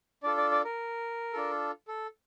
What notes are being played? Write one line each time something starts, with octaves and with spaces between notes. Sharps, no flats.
D4 F4 A4 D5
D5
D5
A#4
D4 F4 A4
A4